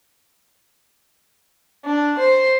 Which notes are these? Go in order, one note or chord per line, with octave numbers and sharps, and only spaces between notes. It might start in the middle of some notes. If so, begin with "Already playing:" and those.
D4
C5